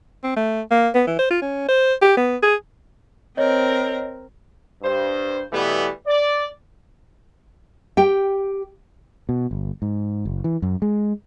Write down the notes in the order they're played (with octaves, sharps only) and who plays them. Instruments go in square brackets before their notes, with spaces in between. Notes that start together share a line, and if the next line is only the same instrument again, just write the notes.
[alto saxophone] C4
A3
A#3
B3
E3
C5
F4
C#4
C5
G4
B3
G#4
[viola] C4 A#4 [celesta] C#5 D#5
[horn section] G2 C5
B2 E3 G3 A3 B3
D5
[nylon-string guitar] G4 G5
[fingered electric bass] B2
G1
G#2
F#1
E3
F#2
G#3